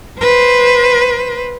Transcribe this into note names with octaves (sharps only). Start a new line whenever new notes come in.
B4 C5